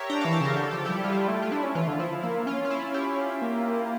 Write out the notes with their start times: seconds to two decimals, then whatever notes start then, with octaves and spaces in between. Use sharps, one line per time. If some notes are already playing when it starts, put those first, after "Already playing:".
Already playing: G4 A#4 C#5 E5
0.10 D4 G5 A#5
0.21 F5 A5
0.25 E3
0.33 F5 A5
0.41 C#3 G4 A#4
0.56 D3 G4
0.64 A4
0.71 F3 G4
0.78 A4
0.85 G3 E4 G4
1.04 G3 F4
1.13 E4
1.20 F4
1.28 A3
1.42 F4
1.52 D4 E4
1.63 C#4
1.75 E3 F4
1.88 D3
1.99 F3 E4
2.23 A#3 E4
2.46 C#4 F4
2.65 F4
2.70 E4
2.94 E4 G4
3.42 A#3